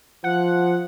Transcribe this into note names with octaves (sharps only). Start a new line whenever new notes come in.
F3 F#5